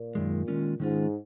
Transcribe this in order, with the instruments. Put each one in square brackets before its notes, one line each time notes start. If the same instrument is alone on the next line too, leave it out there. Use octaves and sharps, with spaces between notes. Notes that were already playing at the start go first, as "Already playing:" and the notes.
Already playing: [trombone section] A#2
[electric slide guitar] F#2 D#3 G#3
D#3 G#3 C#4 F4
[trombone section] G#2 [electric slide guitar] D#3 G#3 C#4 F4